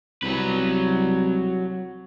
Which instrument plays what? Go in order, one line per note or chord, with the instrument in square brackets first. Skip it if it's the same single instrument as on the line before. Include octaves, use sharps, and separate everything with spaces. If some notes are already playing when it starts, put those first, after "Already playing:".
[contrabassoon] C2 [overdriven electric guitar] F#3 B4